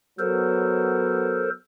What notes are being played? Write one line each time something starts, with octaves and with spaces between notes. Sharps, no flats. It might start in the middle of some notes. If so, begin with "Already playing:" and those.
F#3 B3 A4 A#4 C5